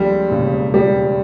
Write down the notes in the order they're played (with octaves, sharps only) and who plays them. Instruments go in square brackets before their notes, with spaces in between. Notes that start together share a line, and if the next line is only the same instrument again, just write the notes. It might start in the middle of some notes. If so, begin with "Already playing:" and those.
Already playing: [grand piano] D#2 D3 F3 G#3 C4 [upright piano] G3
[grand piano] E1 D#2 C#3
[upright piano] G3